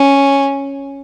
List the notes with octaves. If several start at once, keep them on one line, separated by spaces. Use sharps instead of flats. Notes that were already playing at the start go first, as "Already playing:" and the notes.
Already playing: C#4